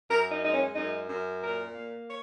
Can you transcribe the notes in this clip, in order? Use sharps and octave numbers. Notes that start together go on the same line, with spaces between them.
F#2 A#4
D#4
G#3 D#4
C#4
F#2 D#4
F#2
A#2 A#4
A#3
C#5